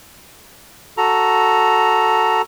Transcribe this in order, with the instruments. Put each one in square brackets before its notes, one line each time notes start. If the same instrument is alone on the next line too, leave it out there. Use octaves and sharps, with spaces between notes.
[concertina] F#4 A4 A#5